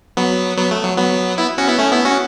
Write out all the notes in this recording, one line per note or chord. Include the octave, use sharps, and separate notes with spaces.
F#3 B3
F#3 B3
A3
F#3
F#3 B3
B3 E4
C#4 F#4
B3 E4
A3 C#4
B3 E4
C#4 F#4